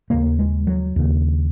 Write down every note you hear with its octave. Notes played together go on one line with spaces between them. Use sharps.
D#2 C#3 A#3
G#3
F#3
D#2 C#3